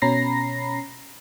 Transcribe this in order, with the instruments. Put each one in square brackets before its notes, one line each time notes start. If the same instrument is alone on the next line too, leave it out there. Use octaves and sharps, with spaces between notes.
[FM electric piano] B2 C#4 A#5 B5 A#6 C7